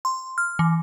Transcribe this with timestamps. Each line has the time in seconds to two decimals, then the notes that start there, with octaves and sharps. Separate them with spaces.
0.05 C6
0.38 F6
0.59 E3